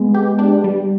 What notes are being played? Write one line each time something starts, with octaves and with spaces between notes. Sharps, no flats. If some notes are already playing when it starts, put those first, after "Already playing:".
Already playing: G#3 B3
G4
D4
G3